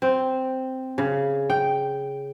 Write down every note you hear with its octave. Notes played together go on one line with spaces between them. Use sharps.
C4
C#3
G5